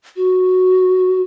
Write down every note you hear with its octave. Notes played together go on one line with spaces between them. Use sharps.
F#4